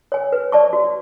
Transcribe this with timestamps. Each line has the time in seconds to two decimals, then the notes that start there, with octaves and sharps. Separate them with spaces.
0.12 C#5 G#5
0.32 B4
0.52 D5 A5 C#6
0.73 F#4